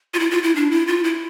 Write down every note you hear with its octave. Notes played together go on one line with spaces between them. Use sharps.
F4
E4
F4
E4
D4
E4
F4
E4